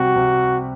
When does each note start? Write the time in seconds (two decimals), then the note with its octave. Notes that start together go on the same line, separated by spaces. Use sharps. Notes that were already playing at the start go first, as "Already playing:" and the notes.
Already playing: C3 G3 C4 F#4
0.16 C3